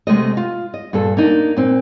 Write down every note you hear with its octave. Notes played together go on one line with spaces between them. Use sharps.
C3 G#3 A3 D#5
F4
D#5
G2 A#2 A4
A#3 D4 D#4
A#2 C4